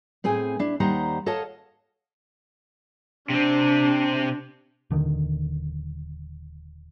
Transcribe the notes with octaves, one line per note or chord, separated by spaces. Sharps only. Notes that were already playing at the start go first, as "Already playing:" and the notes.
A2 C4 G#4 G#5
D4 E4
D#2 G3 D#4 C5 F#5 A#5
A4 C#5 D#5 F5 F#5 A5
C3 C4 D4
D#1 D3 D#3